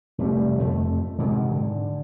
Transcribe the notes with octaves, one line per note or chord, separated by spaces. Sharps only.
F1 G3 A3
F2 F3 A3
G#2 C3
D3